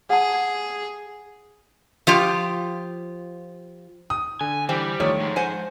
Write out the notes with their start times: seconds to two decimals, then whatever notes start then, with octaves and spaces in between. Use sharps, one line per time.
0.10 G#4 F#5 A5
2.07 F3 F4 G4
4.10 D#6
4.41 D3 G#5
4.69 E3 G3 C5 G5
5.00 D#3 F3 A3 C#5
5.20 G#2 G#3
5.36 C5 F#5 G#5